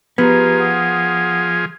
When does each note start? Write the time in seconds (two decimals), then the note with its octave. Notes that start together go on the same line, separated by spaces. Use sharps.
0.18 F3 B3 G4 G#4 B4 A#5
0.58 F#5 D#6